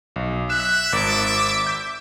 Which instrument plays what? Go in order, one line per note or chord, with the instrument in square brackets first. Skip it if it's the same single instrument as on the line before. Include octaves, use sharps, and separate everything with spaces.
[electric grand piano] B1
[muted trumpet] E5 [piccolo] F#6 [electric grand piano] E7
[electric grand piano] G#1 [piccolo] D6
[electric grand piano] G6